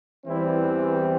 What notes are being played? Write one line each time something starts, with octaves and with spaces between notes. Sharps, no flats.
E2 E3 G3 C4 E4